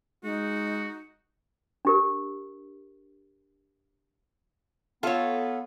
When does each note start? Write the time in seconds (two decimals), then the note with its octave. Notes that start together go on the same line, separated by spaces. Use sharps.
0.24 G#3 D#4 F#4
1.85 D4 G4 A#4
5.03 B3 F4 A4 C#5